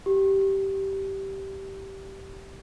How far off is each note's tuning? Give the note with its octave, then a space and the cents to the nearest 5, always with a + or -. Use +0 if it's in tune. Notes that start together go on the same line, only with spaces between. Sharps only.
G4 -15